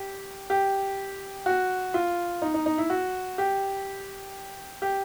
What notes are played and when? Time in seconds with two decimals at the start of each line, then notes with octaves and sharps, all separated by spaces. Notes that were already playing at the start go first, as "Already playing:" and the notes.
Already playing: G4
0.50 G4
1.46 F#4
1.94 F4
2.42 D#4
2.54 D#4
2.66 D#4
2.78 E4
2.90 F#4
3.38 G4
4.82 G4